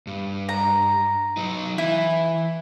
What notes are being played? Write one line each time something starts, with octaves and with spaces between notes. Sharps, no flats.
G2
A#5
F#3 D#4
E3 E4